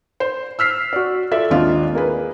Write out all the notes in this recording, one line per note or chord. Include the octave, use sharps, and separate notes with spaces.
C5
E6 F6 B6 C7
F#4 D5
F4 A4 D5 E5
G#1 D#2 C4 D4 F4 D#5
A#3 G#4 B4